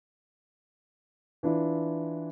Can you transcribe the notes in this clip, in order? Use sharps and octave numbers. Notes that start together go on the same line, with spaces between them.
E3 D4 E4 F4